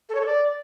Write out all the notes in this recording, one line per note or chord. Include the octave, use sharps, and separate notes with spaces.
A4
C#5
A4
D5